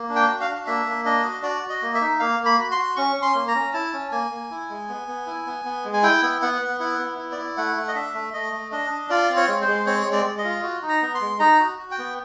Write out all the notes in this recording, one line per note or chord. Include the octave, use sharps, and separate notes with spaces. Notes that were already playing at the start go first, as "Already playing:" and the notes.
Already playing: A#3
D4
G5
F#4
F5
D4
A#3 E5
A#3
D4 D#5
F#4
F#4 D5
F#4
D#5
A#3
E5
D#4
A#3 F5
A#3
B5
F#4
C6
F#4
C#4 C#6
C#4
C6
A#3
A#5
C#4
E4 A5
C#4
A#3 G#5
A#3
E4
G#3
B3
B3
E4
B3
B3
G#3
G#5
E4 G5
B3
B3 F#5
B3
E4 F#5
B3
E4
D5
E4
A3 F#5
A3
D#5
D4 E5
A3
A3 D#5
A3
D4 D#5
D4
F4 D5
C4
C#5
G#3
C5
G#3
C4 C#5
G#3
D5
G#3
D#5
F4
F#4
D#4
A#5
B3
C6
G#3
D#4 A#5
F#4
F#4
G5
B3